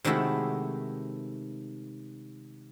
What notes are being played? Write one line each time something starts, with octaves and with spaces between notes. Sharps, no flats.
C3 D#3 G#3 A3 E4 F#4